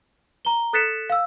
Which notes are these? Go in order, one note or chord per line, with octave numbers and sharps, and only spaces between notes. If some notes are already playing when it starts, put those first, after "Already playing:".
A#5 G7
A4 F#6 A6 B6 C#7 E7
F5 E6